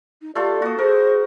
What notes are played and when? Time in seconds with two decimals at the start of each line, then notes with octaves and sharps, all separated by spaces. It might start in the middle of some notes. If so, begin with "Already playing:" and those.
0.22 D#4
0.35 A3 F4 G4 A4 D5
0.62 A#3 F#4 D#6
0.78 G#4 A#4 C5